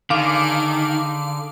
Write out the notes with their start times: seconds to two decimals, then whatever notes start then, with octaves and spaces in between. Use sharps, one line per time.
0.10 D3 D#3 G#4 F5 D6